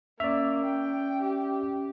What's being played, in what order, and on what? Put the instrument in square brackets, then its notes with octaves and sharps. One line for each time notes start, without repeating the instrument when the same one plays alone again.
[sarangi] A#3 [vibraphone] C#4 [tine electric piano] D5 E5
[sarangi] G5
G4